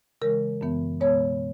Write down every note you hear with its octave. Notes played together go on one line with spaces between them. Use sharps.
C#3 E3 G#3 A#4
F#2 E3 B3
B2 G#3 B3 C#5